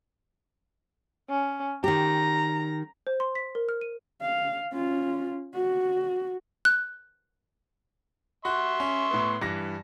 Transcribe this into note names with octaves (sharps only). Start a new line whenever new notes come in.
C#4
D#3 G4 A#5
C5
C6
B6
A#4
F6
D#7
F5
C#4 F4
F#4
F#6
F#4 E5 C6 C#6
C#4
A2 B3
G2 E3 A#6